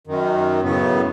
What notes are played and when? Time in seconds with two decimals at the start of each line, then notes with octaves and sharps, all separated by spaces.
0.07 F#2 D#3
0.63 F#2 A2 C#3 B3